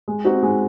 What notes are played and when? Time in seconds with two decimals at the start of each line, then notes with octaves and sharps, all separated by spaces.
0.08 G#3
0.25 C4 D#4 F#4
0.43 G#3